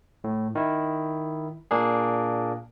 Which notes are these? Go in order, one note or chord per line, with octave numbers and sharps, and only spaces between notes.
A2
D#3 E4
A#2 A#3 D4 G#4